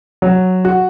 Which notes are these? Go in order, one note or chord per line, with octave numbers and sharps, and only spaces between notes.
F#3
F#4